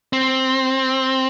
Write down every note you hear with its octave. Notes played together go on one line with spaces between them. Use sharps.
C4